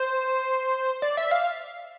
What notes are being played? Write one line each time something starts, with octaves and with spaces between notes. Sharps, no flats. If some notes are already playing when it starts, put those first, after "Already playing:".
Already playing: C5
D5
E5
F5